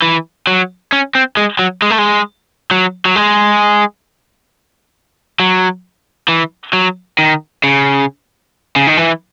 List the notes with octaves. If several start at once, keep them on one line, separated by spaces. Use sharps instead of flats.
E3
F#3
C#4
C4
G#3
F#3
G#3
A3
G#3
F#3
F#3
G#3
F#3
E3
F#3
D#3
C#3
C#3
D#3
E3